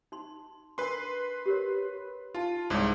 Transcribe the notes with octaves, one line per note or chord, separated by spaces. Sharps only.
D#4 C6
D4 A#4 B4 C6
G4 A#4 C#5
D#4 F4 A5
C2 G#2 C5 C#5